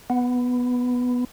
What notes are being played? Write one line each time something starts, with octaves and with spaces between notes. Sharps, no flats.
B3